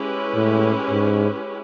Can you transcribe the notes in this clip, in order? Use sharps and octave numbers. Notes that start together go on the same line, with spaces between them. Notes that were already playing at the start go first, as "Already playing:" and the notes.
Already playing: G#3 C#4 E4 G4 B4
A2
G#2